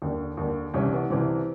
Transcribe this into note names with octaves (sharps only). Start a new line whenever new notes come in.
D#2 D3
D#2 D3
C2 C3 E3 C#4
B3
C2 C3 E3 C4